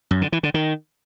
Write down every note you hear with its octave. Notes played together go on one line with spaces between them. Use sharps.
F#2
D3
E3
D3
D#3